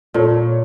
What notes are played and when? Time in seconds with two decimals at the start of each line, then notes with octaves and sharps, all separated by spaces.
0.14 A#2 A4 C#5